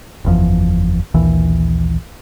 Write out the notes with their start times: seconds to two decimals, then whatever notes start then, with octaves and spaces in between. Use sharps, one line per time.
0.25 F#1 E2 F3
1.14 A#1 D#2 E3